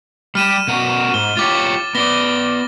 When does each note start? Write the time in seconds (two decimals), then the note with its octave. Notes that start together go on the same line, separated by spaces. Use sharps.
0.35 G3 G4 F6 D#7 E7
0.68 B2 F#4 A#4
1.14 G#2 G7
1.37 F4 G4 C#5 D6 A6
1.95 B3 D5 A#6 G7